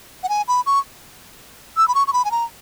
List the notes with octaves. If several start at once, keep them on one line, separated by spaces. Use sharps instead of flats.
F#5
G#5
B5
C#6
E6
B5
C#6
C#6
B5
G#5
A#5